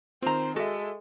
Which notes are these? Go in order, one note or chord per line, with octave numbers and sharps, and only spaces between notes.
D#3 C4 F4 C5 A#5
G#3 F#4 A4 E5